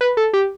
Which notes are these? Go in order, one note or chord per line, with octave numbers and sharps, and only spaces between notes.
B4
A4
G4